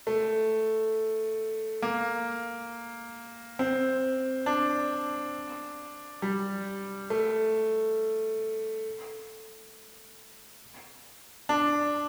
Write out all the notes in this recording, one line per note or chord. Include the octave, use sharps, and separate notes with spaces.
A3
A#3
C4
D4
G3
A3
D4